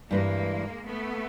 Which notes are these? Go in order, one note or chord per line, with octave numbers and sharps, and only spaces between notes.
G2 E3 G3 G#3 A#3
A3 B3